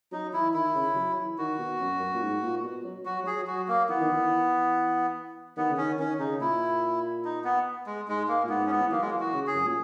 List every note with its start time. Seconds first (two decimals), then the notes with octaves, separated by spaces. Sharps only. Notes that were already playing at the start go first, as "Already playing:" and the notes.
0.12 F#3 D#4
0.33 E3 E4
0.54 D#3 E4
0.75 C#3
0.95 F#3
1.17 E3
1.38 D#3 F#4
1.59 B2
1.80 F#2
2.00 F#2
2.14 A#2
2.22 G#2
2.42 A#2
2.64 B2
2.84 F#3
3.04 F#3 F#4
3.23 F#3 G#4
3.42 F#3
3.47 F#4
3.68 A#3
3.89 E3 B3
4.01 D#3
4.12 E3
5.56 D#3 B3
5.71 C#3
5.77 D#3 C#4
5.98 D#3 C#4
6.19 C#3 D#4
6.40 A#2 E4
7.25 D#4
7.44 B3
7.87 G#3
8.08 G#2 G#3
8.28 A#3
8.44 A#2
8.49 G#2 B3
8.66 C#4
8.70 B3
8.81 E3
8.92 F#3 A#3
9.01 G#3
9.10 A#3
9.13 E3
9.20 F#4
9.34 C#3
9.47 G#4
9.55 F#2
9.66 A#2